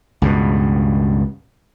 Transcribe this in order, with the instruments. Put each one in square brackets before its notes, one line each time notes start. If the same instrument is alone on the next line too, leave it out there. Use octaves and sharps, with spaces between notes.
[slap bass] C#2 G2 B2